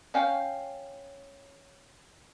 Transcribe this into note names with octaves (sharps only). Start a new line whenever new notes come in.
C#4 F5 G5